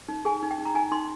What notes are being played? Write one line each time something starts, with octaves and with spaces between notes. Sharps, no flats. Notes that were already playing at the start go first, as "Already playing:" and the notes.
D#4
G#4 G#5
D#4
G5
D#4
A#5
D#4 G#5
D#4 C6